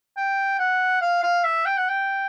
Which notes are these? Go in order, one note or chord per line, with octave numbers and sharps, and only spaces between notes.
G5
F#5
F5
F5
E5
G5
F#5
G5